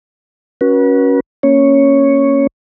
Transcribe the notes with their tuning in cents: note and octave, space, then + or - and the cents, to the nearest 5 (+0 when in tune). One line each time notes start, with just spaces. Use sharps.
C#4 +0 F#4 +0 B4 -40
A#3 +0 C#4 +0 C#5 +0